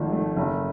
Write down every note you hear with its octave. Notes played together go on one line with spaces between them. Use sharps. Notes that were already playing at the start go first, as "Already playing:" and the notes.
Already playing: G#1 G#2 F3 A3
A3
F#1